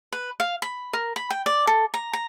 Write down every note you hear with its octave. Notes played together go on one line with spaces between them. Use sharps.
B4
F5
B5
A#4
B5
G5
D5
A4
A#5
A#5